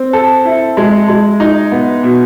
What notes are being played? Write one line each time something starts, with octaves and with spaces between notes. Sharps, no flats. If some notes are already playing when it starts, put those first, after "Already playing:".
Already playing: C4
A4
E4
G#3
G#3
D#4
B3
B2